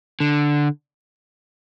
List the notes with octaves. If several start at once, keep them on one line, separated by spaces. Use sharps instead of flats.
D3